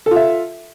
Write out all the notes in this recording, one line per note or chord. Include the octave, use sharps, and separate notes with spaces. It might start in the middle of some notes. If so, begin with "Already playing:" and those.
F4 A4 E5